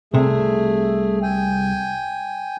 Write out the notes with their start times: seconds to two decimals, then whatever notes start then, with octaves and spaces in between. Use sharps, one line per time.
0.14 C2 C3 A3 G#4
1.22 G5 G#5